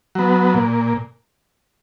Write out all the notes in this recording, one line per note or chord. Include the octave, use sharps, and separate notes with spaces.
F#3 B3
A#2